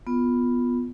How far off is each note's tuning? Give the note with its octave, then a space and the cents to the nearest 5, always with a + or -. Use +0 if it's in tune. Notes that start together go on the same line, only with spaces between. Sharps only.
B3 +0 F4 +0